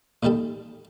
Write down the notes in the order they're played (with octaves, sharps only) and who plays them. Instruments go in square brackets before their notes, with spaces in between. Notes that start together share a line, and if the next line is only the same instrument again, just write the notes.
[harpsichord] A1 D#2 D#3 G3 A4